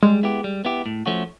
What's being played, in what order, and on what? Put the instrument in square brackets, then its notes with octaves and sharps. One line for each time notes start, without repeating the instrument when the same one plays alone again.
[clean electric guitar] G3 [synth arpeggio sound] G#3
[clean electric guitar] B3 E4 G4
G3
B3 E4 G4
A2
F3 A3 C#4 F#4